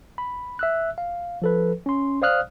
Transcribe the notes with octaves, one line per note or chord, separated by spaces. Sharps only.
B5
E5 E6 F#6
F5
F3 A4 B4
C#4 C6
C5 D5 F5 D#6 F6 F#6